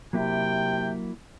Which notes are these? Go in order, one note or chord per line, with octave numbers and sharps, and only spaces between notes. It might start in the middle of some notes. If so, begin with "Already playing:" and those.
C3 F#3 A#3 E4 G5